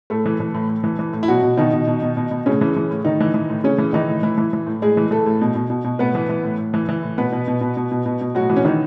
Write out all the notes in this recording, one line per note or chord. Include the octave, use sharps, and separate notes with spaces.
A2 A3 A4
E3
E3
A2
A2
E3
E3
A2
E4
B2 F#3 F#4
B2
B2 D#3 D#4
B2
B2
B2
B2
B2
A2 C#3 C#4
E3
E3
A2
A2 D#3 D#4
E3
E3
A2
A2 C#3 C#4
E3
D#3 E3 D#4
A2
A2 E3 E4
E3
E3
A2
A2 G#3 G#4
E3
E3 A3 A4
A2
B2
B2
B2
B2
A2 B3 B4
E3
E3
A2
A2
E3
E3
A2
B2 B3 B4
B2
B2
B2
B2
B2
B2
B2
A2 F#3 F#4
E3
C#4
D#3 E3 D#4